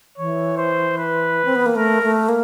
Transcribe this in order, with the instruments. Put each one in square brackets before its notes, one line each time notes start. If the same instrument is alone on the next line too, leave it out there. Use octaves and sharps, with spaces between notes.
[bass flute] E3 [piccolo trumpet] C#5
[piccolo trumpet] C5
B4
[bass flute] C4
B3
A#3
[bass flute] A3 [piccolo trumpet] A#4
[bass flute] A3
A#3